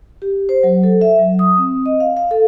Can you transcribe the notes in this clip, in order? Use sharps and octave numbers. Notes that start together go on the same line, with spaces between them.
G4
C5
F#3
A4
E5
F#3
D#6
C4
D#5
F5
F5
A4